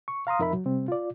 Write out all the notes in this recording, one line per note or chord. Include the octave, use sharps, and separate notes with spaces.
C#6
F5 A#5 C6 D#6
F2 D#4 A#4 E5 B5
F#3
C3 G3 C4
F4 D5